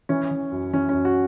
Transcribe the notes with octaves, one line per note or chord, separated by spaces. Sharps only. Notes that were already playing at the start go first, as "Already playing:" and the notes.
E3 C#4
E3
F#2
E3 C#4
C#4
F#2
F#4